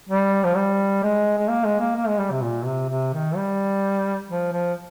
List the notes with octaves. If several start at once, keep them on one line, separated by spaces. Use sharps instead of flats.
G3
F3
G3
G#3
G#3
A#3
G#3
A#3
A#3
G#3
G3
C3
A#2
C3
C3
D#3
G3
F3
F3